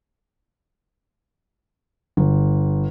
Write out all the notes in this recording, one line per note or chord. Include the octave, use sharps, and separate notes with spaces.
G1